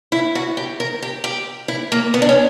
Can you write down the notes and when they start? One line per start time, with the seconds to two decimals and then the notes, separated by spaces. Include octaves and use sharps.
0.12 E4
0.35 F#4
0.57 G4
0.80 A#4
1.02 G4
1.24 G4
1.68 E4
1.92 A#3
2.14 B3
2.22 D4
2.29 C#4